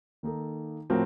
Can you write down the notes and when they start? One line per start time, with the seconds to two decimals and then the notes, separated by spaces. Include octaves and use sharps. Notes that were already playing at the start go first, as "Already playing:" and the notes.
0.23 D#3 A#3 D#4 A4
0.90 A2 F3 C4 F#4 A#4